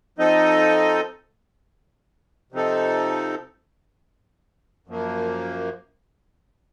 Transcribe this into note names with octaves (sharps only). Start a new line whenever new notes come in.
F3 C4 D#4 A4 D#5
C3 F3 C4 D#4 A4
F#2 F3 A#3